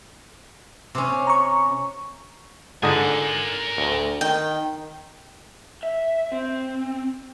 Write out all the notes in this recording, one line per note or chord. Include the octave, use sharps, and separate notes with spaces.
C3 C#4
A#5 C#6
G#2 D3 A#4 G#5 D#6
D2
D#3 G5
E5
C4